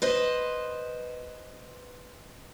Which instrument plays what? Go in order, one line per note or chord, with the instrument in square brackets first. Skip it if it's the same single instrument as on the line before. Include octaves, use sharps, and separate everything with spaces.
[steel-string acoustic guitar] B4 C5 D#5